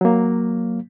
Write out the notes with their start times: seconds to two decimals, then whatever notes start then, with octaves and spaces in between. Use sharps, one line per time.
0.01 F#3 A#3